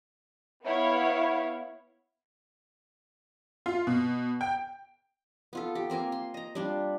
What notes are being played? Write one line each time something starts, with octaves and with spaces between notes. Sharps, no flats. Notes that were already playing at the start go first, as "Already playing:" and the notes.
B3 E4 C#5 F5
F4
B2
G5
B3 F4 A4
G4
A#3 C4 A#4 G#5
C6
D#5 A#5
G3 D4 F4